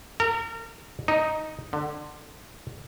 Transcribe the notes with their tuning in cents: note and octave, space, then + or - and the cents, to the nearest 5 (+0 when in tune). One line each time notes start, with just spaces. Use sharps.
A#4 -35
D#4 +0
D3 +25